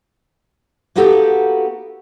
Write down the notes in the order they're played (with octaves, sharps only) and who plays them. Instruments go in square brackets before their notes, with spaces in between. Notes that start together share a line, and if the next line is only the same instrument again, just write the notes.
[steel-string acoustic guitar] A#3 B3 D#4 F#4 G4 A4